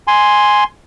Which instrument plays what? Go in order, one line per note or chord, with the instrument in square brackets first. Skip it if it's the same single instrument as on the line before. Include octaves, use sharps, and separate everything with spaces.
[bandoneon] G#5 C6